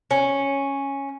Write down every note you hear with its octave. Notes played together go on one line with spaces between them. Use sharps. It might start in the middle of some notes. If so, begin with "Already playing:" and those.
C#4